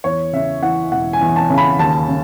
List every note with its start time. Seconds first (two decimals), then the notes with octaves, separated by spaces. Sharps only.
0.04 E2 C#5
0.33 C#3 E5
0.62 E3 F#5
0.91 E1 F#5
1.13 G#5
1.21 E2
1.36 A5
1.50 C#3
1.58 B5
1.79 D#2 A5
2.08 C#3